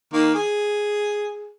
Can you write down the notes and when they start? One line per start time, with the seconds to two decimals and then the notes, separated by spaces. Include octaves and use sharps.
0.13 D#3 A#3
0.35 G#4